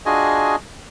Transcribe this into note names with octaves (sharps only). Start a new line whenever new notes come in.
D4 F4 F#4 G#4 D#5 G#5